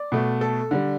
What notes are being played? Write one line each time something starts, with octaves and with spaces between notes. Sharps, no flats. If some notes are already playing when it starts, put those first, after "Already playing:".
Already playing: D5
B2 A3
A4
D3 G3